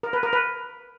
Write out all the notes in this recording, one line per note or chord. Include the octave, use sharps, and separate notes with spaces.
A#4
B4
A#4
B4